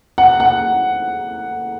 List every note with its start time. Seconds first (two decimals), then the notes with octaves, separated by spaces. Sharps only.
0.18 F#5
0.40 F#5